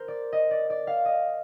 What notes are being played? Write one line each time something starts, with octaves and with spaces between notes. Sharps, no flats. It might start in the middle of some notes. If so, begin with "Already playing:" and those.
Already playing: A#4 C5
D5
D#5
D5
D5
F5
D#5